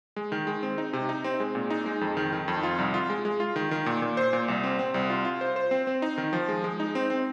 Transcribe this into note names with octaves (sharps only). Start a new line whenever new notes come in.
G#3
D#3
G#3
C4
D#4
C3
D#4
C4
G#3
A#2
D#4
G#3
F2
D#3
D#3
F2
F4
C2
F4
G#3
G#3
F4
D#3
D#3
A#2
A#2
C5
A#2
C2
C4
C4
C2
F4
F4
C5
C5
C4
C4
D#4
D#3
F3
G#3
G#3
D#4
C4
C4